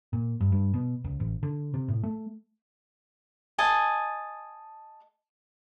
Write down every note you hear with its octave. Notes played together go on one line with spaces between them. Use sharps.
A#2
G2
G2
B2
C#2
A1
D3
C3
A2
A3
D#5 G#5 A5